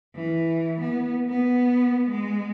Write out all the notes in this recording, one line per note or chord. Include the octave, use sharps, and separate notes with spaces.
E3
B3
B3
G#3